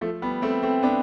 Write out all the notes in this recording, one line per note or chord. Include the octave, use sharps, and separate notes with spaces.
F3 A3
G3 B3
A3 C4
A3 C4
B3 D4